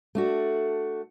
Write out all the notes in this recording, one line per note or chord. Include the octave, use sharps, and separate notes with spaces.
A3 D4 F#4